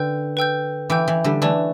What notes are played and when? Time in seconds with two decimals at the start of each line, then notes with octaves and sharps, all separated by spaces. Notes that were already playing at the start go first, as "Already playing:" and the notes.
Already playing: D3 B4 G5 E6 G6
0.37 B4 G5 E6 G6
0.90 E3 B4 G5 E6 G6
1.08 E3
1.24 D3 G3
1.42 E3 A3 B4 D5 A5